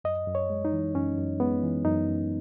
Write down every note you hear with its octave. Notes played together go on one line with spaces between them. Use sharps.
F#2 D#5
F#2
C#5
G#3
D#4
E3
F#2 C#4
F#2
G#3 B3
E3
F#2 D#4
F#2